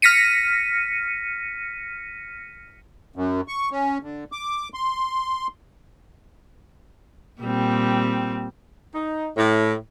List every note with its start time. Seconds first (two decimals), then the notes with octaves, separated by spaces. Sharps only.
0.02 F6 A#6 B6 C#7 D#7
3.16 F#2
3.48 C#6
3.71 C#4
4.03 D3
4.32 D6
4.74 C6
7.41 A#2 G3 C4
8.94 D#4
9.37 A2